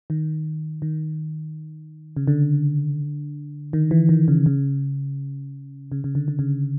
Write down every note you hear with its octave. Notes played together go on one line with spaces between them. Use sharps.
D#3
D#3
C#3
D3
D#3
E3
D#3
C#3
C#3
C#3
C#3
D3
D3
C#3